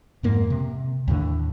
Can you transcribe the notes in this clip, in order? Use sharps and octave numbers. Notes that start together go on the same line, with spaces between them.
F2 G#2 A#3
C3
D#2 A2 D3